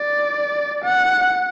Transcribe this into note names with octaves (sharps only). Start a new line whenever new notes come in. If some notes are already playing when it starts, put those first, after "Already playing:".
Already playing: D5
F#5